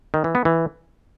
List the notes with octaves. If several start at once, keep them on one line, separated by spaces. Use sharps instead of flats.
D#3
E3
B3
E3